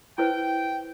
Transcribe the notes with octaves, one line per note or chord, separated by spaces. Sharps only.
E4 B4 C5 G5